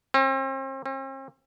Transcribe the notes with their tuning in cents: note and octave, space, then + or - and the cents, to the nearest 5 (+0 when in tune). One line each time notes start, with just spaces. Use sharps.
C4 +40
C4 +45